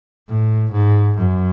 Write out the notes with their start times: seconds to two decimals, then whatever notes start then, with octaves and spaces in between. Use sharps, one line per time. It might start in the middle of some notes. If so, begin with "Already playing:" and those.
0.28 A2
0.72 G#2
1.17 F#2